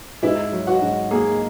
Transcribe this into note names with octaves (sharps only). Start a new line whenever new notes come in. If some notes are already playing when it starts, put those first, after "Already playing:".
G#2 E4
F#3
F#4
G#2
A#3 G#4